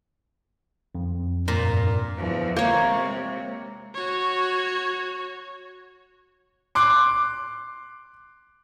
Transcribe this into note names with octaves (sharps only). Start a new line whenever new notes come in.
F2
G2 A#2
E2 F3
C3 G#3 A#3 C#5
F#4 C#5
C6 D6 F#6